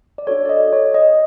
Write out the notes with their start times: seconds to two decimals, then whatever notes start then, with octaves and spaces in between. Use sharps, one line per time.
0.18 D5
0.27 D4 F#4 A4 C#5
0.45 D5
0.49 D#5
0.73 C#5
0.94 D#5